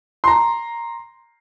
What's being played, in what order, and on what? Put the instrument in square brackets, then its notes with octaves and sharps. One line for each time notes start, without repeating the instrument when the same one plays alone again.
[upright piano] A#5 C6